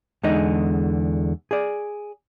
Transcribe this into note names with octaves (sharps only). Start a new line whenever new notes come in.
E2 D3 G#3 D#4 D#5
G#4 D5